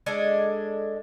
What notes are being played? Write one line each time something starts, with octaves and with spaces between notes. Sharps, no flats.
G#3 D4 A4